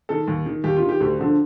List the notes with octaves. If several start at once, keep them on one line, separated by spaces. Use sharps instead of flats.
D#3 A4
D#2
D#3
D#2 G4
F4
D#3
G4
D2
D3 F3